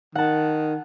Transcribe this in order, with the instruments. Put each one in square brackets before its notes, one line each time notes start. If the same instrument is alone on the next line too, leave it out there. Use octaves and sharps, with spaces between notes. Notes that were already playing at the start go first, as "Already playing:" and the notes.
[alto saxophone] D#3 [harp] F#5 A5